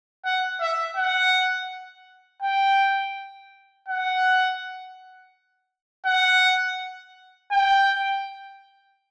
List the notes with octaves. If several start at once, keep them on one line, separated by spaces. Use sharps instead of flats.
F#5
E5
F#5
G5
F#5
F#5
G5